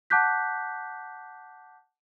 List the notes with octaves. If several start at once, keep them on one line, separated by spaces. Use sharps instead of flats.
F#5 A5 D6 F#6 G6 B6